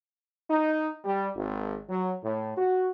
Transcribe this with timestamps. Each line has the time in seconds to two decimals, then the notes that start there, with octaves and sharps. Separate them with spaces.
0.49 D#4
1.04 G3
1.35 G#1
1.87 F#3
2.23 A2
2.56 F#4